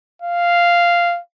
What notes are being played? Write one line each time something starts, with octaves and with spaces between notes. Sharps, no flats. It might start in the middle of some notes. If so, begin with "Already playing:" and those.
F5